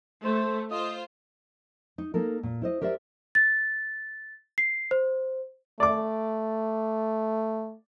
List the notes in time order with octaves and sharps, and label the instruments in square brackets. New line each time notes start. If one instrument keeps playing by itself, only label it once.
[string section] A3 [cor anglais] C5
[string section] F4 C5 [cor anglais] D#5
[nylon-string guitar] D#4
A#3 D#4 A4 A#4
A#2
E4 C5 D#5
G4 A#4 C5 D5 E5
[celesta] A6
C7
C5
[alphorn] A3 [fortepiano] D5 D6